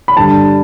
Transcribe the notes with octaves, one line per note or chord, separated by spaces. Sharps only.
B5
G2 D3 G3 A5